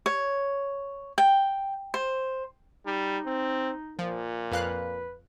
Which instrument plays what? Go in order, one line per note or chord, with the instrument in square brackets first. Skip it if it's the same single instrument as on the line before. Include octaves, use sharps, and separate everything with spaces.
[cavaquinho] C#5
G5
C5
[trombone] G3 [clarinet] D#4
[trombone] C4
[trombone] A#2 [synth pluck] F3
[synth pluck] F2 F5 F#6 [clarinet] B4